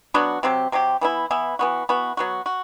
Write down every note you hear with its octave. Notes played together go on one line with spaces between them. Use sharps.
F#3 B3 D4 F#4
C3 F#3 C4 G4
C3 F#3 C4 G4
E3 B3 E4
E3 B3 E4
E3 B3 F#4
E3 B3 F#4
F#3 B3 F#4
F#4